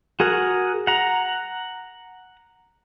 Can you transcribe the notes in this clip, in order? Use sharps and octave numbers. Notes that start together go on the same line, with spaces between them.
F#4 G#4 A#4 F#5
F#5 A#5